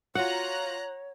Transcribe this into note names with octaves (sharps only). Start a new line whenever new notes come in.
F4 F#4 C#5 F#5 A#5 F#6